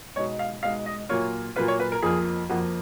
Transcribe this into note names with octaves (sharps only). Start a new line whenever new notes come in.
B2 G#3 D#4 C#5
F5
B2 G#3 D#4 F5
D#5
A#2 F#3 A#3 F4 C#5
A#2 F#3 A#3 F4 B4
C#5
B4
A#4
F2 F3 A#3 F4 G#4
F2 F3 A#3 F4 F#4